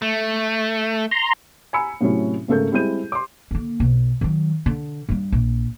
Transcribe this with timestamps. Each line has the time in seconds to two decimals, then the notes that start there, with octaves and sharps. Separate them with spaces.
0.02 A3
1.11 A#5 C6
1.73 G#5 A#5 B5 E6 C#7
2.01 A2 C3 F#3 C#4 E4
2.48 G#1 C#3 A3 A4 A#4 G6
2.72 G3 G#3 C4 E4 G6 D#7
3.12 C6 D6
3.51 D3 A#3
3.80 B1
4.21 D#3 F#3
4.66 D3
5.09 G2 G3
5.32 A#1